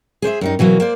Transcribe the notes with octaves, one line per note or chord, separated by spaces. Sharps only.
G#4 C5 D5 E5
F#2 G3 D#4
B2 E3 F#3 A#3
A#3 C5 D5